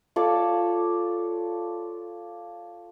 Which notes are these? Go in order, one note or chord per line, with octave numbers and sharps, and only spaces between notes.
F4 A4 C#5 D5